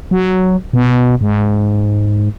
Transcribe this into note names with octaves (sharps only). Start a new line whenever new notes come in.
F#3
B2
G#2